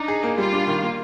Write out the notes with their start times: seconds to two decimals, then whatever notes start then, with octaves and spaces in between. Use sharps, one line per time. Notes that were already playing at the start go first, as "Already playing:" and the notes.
Already playing: D4 D#4
0.08 G#4
0.23 A#3
0.38 G3 F4
0.53 D4
0.67 D#3
0.82 A#3